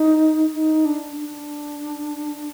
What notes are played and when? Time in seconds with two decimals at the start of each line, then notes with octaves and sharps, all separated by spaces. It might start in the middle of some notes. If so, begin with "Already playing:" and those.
Already playing: D#4
0.55 D#4
0.85 D4
1.16 D4